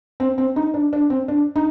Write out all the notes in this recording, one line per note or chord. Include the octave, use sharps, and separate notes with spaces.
C4
C4
D#4
D4
D4
C4
D4
D#4